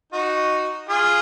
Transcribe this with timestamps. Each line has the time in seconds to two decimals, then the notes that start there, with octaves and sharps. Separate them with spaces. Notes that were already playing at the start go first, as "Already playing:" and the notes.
0.13 D#4 F#4
0.89 F4 G#4